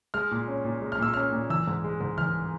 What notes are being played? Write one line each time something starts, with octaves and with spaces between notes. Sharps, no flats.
G#3 F6
A#2
C#4
A#2
G#3
F6
A#2 E6
C#4 F6
A#2
E3 E6
G#2
G#3
G#2
E3 F6